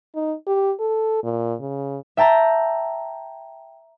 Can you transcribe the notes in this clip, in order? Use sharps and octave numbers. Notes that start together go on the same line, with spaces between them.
D#4
G4
A4
A#2
C#3
E5 G5 A5 A#5